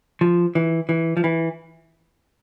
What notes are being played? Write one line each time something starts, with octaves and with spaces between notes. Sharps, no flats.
F3
E3
E3
F3
E3